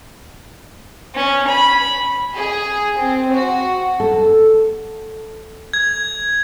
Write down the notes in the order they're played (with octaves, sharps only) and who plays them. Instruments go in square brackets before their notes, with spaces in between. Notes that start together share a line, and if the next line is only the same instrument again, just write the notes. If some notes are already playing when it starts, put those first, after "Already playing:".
[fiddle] C#4
B5
[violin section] G#4
C4
F#4
[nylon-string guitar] A4
[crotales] G#6